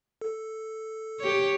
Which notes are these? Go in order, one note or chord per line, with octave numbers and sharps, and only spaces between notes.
A4
G4 C#5